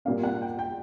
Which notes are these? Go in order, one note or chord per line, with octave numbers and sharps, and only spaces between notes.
A#2 G3 A#3 C#4 F5
F#5
G5
G5